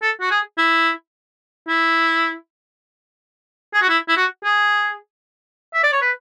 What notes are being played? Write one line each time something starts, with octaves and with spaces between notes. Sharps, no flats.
A4
F#4
G#4
E4
E4
G#4
F#4
E4
E4
F#4
G#4
E5
D5
C#5
B4